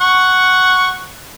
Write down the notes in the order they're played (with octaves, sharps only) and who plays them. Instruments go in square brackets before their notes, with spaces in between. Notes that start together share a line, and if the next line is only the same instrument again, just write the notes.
[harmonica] F#5 C#6